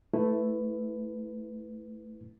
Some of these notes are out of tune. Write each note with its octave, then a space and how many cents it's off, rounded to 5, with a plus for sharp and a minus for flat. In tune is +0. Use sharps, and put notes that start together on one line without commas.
A3 +0 E4 +0 B4 +15